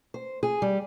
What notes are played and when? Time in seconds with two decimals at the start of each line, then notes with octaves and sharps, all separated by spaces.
0.14 C5
0.43 G#4
0.62 G3